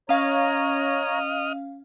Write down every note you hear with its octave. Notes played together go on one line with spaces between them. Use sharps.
C#4 C#5 D#5 F5 A#5 F6